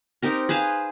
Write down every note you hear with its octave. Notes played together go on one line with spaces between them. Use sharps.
C4 D#4 G4 A#4
G#4 B4 C5 F5